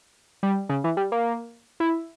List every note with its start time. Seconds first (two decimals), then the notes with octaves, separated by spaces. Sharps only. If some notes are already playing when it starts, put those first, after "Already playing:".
0.43 G3
0.69 C#3
0.84 E3
0.97 G3
1.12 A#3
1.80 E4